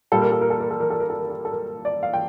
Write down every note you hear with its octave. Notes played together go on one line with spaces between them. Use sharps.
A#2 G3 A#3 A4
A#4
A4
A#4
A4
A#4
A4
A#4
A4
A#4
A4
A#4
A4
A4
A#4
D5
F5
G5